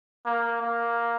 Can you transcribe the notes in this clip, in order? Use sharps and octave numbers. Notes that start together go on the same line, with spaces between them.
A#3
A#3